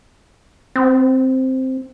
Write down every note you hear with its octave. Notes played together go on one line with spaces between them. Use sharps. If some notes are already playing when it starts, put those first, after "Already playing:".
C4